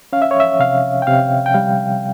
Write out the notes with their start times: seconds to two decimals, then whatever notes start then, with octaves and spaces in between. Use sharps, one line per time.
0.13 C#4 F5
0.22 E5
0.31 C#5
0.40 E5
0.60 C3 F5
1.02 G5
1.07 C3 F5
1.46 G5
1.54 G3 F5